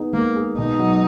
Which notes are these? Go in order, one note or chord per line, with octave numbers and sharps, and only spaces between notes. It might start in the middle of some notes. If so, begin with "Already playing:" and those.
Already playing: B3 D#4 G#4
G#3 A#3
G#4
B2 D#4
F#3